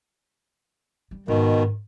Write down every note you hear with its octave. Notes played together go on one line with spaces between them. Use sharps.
G3
G#2 B2 D#3